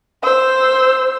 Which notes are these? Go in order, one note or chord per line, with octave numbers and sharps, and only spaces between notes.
C5 E6